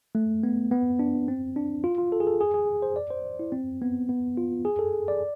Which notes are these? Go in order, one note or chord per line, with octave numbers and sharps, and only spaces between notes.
A3
B3
B3
D4
C4
D4
F4
F4
A4
G#4
A4
G#4
G#4
C5
D5
C5
E4
C4
B3
B3
F4
G#4
A4
D5